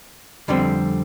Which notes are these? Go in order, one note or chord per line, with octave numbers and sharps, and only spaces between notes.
F2 D3 G3 C4